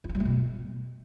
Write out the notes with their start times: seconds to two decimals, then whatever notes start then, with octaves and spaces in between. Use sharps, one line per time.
0.04 E4
0.09 F4
0.15 G3
0.20 A3
0.25 B2